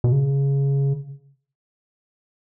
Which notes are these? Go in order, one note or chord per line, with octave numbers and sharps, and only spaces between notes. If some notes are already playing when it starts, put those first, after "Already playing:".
B2
C#3